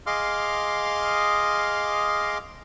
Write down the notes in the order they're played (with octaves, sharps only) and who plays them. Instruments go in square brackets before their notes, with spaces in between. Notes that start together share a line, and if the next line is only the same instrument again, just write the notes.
[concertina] G#4 D#5 F5 C6 D6 F6